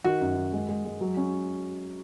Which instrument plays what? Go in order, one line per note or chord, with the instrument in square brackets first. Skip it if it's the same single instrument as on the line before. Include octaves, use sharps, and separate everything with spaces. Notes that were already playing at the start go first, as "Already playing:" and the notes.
[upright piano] D#3 [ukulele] F#4
[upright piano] F#2
D#3
G#3
G#3
G#3
F#3
C#4